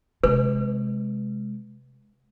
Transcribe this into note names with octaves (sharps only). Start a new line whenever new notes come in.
C3 G#3 B4